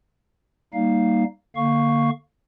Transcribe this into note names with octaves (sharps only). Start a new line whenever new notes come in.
G3 A#3 D#4 F5
D3 A#3 F5 C#6